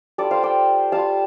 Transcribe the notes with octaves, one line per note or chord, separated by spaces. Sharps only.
G3 F4 A4 D5
C5 F5
D5 G5
G3 F4 F5 A5